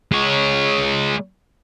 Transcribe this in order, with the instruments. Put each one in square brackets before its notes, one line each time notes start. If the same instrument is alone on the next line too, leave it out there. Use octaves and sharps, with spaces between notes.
[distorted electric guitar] G#3 C#5